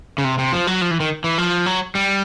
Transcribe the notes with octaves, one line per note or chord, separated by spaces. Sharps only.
C#3
C3
C3
F3
F#3
F3
E3
D#3
E3
F3
F#3
G3